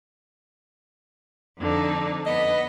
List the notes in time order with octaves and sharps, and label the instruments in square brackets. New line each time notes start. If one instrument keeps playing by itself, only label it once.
[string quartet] F2 D3 D#4
[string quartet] B3 B5 [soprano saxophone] D#5